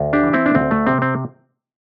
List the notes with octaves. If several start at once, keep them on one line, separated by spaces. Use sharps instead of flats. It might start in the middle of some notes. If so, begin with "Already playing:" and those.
Already playing: D2
D4 G4
E3
C4 E4
D4
D2 C4
A3
C3 C4
C4